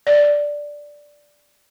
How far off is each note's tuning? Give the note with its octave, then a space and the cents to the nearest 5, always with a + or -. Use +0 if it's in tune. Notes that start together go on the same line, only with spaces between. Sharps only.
D5 +0